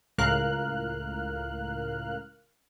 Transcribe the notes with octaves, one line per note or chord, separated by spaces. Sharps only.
C#2 A2 A#4 F5 F6 F#6